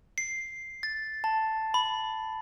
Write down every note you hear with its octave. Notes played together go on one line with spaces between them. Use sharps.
C7
A6
A5
B5